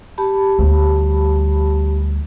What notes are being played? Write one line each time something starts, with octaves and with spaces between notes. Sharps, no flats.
G4 A5 B5
D2 G3